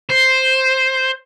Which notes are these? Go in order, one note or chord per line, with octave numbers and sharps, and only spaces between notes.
C5